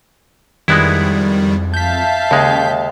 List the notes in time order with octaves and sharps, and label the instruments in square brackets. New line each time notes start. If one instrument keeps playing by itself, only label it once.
[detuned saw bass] F2 [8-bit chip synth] D#3 G3 [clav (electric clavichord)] G#3 B3 E4
[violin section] E5 F5 A5 [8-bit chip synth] G6 B6
[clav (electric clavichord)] D#2 G#3 [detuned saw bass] C#3